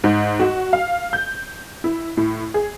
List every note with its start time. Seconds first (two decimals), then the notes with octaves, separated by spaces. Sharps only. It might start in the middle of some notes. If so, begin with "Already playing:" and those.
0.04 G#2
0.40 F#4
0.73 F5
1.13 G6
1.84 E4
2.17 A2
2.54 G#4